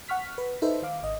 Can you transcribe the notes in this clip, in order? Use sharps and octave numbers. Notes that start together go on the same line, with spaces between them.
F#5 C#6 F6 B6
B4
D#4 A4 B4 C5 E5
D#3 F5 D6
G#1 D#5